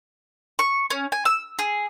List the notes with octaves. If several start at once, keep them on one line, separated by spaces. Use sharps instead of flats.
C#6
C#4
G#5
E6
G#4